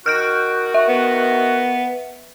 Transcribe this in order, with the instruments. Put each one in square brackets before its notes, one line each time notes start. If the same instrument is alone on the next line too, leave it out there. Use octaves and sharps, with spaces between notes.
[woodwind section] D#3 F#4 [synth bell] F6 G6 D7
[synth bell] E5
[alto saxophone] B3